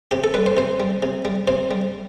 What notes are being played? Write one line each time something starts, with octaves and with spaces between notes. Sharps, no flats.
C3 G4
A4
G3 B4
C5
C3 C5
G3
C3
G3
C3 C5
G3